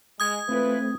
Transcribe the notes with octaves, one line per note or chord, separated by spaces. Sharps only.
G#3 D#6 G#6
E3 A3 C4 F4 B4